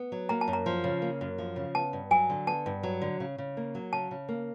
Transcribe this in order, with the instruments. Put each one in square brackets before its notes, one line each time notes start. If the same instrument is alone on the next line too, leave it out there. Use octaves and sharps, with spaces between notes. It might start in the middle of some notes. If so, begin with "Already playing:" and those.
Already playing: [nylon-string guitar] B3
F#3
[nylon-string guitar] A#3 [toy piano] A#5
[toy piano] A5
[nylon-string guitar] F#2
[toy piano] A#5
[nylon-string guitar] F3
C#3
A#3
F#2
F3
C#3
[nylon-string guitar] B3 [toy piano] A5
[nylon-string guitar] G2
[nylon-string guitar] F#3 [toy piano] G#5
[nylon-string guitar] D3
[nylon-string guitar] B3 [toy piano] A5
[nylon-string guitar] G2
F#3
D3
C#3
C#3
A#3
F#3
[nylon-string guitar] C#3 [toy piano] A5
[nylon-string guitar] C#3
A#3